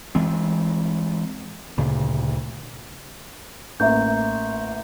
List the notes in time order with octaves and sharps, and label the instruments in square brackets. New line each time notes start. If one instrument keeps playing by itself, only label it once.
[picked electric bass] E3 G#3 C4
D2 A#2 C#3
[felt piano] A1 A#3 [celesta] E5 A#5 G6